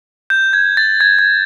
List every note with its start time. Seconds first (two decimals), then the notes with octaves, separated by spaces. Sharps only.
0.30 G6
0.53 G#6
0.77 A6
1.01 G#6
1.19 G#6